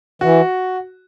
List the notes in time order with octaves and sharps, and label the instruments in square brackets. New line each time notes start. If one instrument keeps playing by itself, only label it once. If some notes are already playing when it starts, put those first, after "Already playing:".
[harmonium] E3 [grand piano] F#4